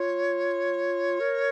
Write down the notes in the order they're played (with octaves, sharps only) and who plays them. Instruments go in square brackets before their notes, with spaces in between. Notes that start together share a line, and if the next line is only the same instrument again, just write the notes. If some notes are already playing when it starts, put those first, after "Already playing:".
Already playing: [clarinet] F4 [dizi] C#5
[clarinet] A#4